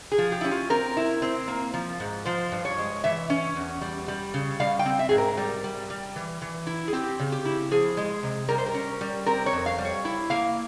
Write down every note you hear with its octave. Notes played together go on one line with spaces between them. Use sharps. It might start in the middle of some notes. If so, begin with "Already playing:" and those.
G#4
F3
G4
C#4 E4
F4
C4 A#4
E4
C4
A#3
F3
G#2
F3 C5
G2
C#5
G#3
E3 E5
C#4
E2
G3
G3
C#3
G3 F5
G5
C4
E5
G#2 G#4
A#4
G3
G3
G3
E3
E3
E4
G#4
C4 G4
C#3
G4
E4
F3 G#4
G#3
C3
G3 A#4
C5
A#4
C#4
G3
C4 A#4
C#5
F2
F5
G3
C#5
E4
A#3 F5